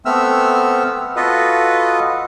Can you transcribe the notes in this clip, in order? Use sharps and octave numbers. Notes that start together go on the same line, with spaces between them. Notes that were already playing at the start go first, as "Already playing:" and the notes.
A3 B3 C4 E5 E6 F6
F4 F#4 A4 B4 D#5